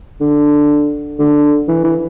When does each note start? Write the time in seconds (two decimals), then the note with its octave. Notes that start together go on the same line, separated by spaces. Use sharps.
0.21 D3
1.19 D3
1.68 E3
1.84 E3